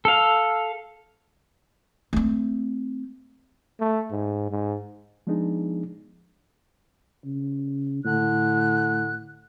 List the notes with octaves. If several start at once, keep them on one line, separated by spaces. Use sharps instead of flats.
A4 F5
A3 C4
A3
G#2
G#2
F3 G#3 B3 D4 D#4 G#4
C#3
A2 D3 F#6